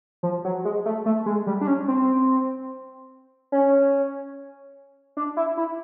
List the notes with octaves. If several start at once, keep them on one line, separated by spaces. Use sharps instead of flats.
F3
F#3
G#3
A3
A3
G#3
G3
D4
C#4
C4
C#4
D4
E4
E4